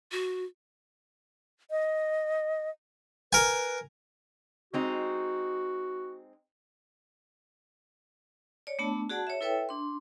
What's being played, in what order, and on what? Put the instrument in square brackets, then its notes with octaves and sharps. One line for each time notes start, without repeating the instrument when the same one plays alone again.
[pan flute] F#4
[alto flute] D#5
[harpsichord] A#4 G#5 [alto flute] B4
[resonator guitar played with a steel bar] G#3 C4 D#4 [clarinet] F#4
[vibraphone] C#5 D5
A3 B3 D4 A5
F#4 G#4 D5 F#5 A5
C#5 E5
E4 A4 B4 C#5 E5 G5
D4 C6